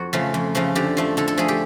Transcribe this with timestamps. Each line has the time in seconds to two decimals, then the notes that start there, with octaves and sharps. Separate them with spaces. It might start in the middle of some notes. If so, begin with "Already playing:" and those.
Already playing: F2 F#4
0.13 C#3 F3 A3
0.34 F2
0.55 C#3 F3 A3
0.75 D3 G4
0.97 F3 A3
1.17 D3 A4
1.28 A4
1.38 F3 A3 G#4
1.48 G4